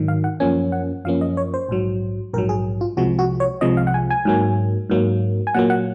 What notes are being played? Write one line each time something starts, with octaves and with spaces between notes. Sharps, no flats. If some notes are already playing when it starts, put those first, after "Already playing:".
Already playing: G#2 D#3 F#3
F5
F#5
F#2 F3 A#3 C#4 G#5
F#5
F#2 F3 A#3 C#4 F5
D#5
C#5
C5
A#1 G#2 F#3
A#1 G#2 F#3 A#4
G#4
F4
C2 C3 F3 G#3 F#4
F#4
C#5
C2 C3 F3 G#3 D#5
F5
F#5
G#5
G#5
G#2 F#3 A#3
G#2 F#3 A#3
G#5
A#2 F#3 A#3 F#5
F#5